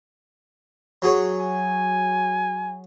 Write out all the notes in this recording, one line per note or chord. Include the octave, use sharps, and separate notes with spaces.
F#3 G#4 C#5
G#5